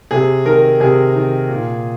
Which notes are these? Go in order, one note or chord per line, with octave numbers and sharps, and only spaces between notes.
C3 G#4
D#3 A#4
C3 G#4
D#3
A#2